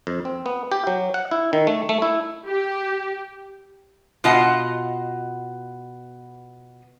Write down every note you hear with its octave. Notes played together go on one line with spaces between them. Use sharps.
F2
C4
B3
G4
F#3
F#5
E4
D#3
A3
A3
E4
G4
B2 F4 D#5 F#5